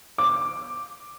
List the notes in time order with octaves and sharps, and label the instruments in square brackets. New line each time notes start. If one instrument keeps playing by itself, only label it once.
[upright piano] D6